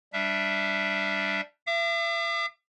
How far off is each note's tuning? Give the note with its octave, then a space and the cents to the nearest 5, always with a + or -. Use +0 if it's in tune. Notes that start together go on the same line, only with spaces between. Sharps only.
G3 +0 D4 +0 E5 +0
E5 +40 D6 +45